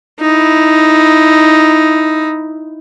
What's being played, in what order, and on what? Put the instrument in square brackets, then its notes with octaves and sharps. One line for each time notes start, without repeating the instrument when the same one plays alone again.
[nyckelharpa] D#4 E4